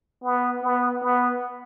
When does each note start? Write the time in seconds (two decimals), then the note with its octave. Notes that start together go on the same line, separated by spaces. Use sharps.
0.24 B3
0.63 B3
1.02 B3